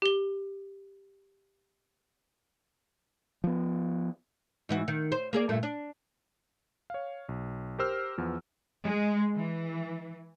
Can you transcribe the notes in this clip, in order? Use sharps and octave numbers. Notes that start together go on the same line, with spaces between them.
G4 G7
F3 B3
G#2 E3 F#4
D#3
C5
A#3 G#4 D5
G2 A#2 A3
D4
C#5 F5
B1
G4 A#4 C5 E6 F6
E2 F3 B3
G#3
E3